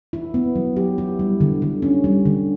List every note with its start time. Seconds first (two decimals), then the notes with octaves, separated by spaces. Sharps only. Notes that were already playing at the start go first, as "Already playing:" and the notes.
0.13 E4
0.34 B3
0.55 F#3
0.77 G4
0.98 E4
1.19 G3
1.41 D3
1.62 D3
1.82 C#4
2.04 G3
2.26 D3